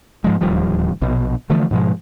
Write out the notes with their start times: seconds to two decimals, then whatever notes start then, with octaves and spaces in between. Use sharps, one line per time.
0.24 G#2 F3 G#3
0.41 D1 D#2 F3 G3
1.02 A#1 B2
1.50 D3 E3 F3 A3
1.71 G#2 B2 F3 G#3